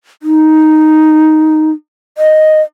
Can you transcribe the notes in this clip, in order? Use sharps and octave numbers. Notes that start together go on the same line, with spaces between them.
D#4
D#5